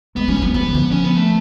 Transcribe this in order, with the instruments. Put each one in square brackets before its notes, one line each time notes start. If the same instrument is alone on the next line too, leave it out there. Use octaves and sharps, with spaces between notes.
[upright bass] G#3 [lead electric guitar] B3
[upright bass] F#3 [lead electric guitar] C#4
[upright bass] F3
[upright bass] F#3 [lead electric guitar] B3
[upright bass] F#3 [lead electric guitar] B3
[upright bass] F3
D3
F3
[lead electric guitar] C#4
B3
A3